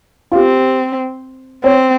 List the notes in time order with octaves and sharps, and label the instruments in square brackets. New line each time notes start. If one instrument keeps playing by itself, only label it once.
[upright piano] F4
[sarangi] C4 [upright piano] G4
[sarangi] C4 [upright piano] C#5